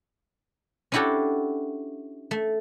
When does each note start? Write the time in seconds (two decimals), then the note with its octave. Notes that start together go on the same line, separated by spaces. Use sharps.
0.92 C#4 D4 E4 F#4 G4 A4
2.31 A3